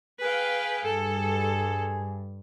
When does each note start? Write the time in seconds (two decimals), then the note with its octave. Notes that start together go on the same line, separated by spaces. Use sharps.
0.22 G#4 B4 F5 G5
0.86 G2 A4